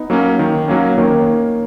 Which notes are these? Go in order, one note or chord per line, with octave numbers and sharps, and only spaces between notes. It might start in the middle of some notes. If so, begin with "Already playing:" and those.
Already playing: B3 D#4
F#3 A#3 C#4
D#3
F#3 A#3 C#4
D#3 A#3 C#4